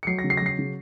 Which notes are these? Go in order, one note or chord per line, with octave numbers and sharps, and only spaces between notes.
C#7
F#3 C7
A#6
C#3
C7
A#6
F#3 C7
C#3